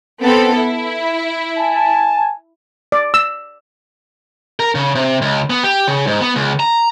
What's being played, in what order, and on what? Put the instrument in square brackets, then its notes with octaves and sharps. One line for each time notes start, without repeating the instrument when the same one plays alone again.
[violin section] B3 C4 A4
E4
[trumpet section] G#5 A5
[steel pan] D5
E6
[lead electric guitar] A#4
C#3
C3
C#2
B3
G4
C#3
G#2
B3
C#2
A#5